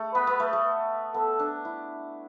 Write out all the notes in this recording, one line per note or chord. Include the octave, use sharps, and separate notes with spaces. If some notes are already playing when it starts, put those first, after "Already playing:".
Already playing: A3
B3 B4
B3
A3
A3
B3 A4
D4
E4